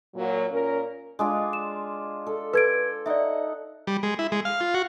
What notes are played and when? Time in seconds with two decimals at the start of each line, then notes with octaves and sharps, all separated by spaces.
0.16 A#2 F#3
0.52 A#2 C#4 A#4
1.19 G#3 D4 F4
1.53 E7
2.27 A4
2.53 A4 B4 G#6 D7
3.06 D#4 D5 E5 F#5
3.87 G3
4.03 G#3
4.19 E4
4.32 G#3
4.45 F5
4.60 F4
4.74 F#4